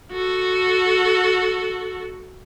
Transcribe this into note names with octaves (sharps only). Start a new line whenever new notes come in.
F#4 A4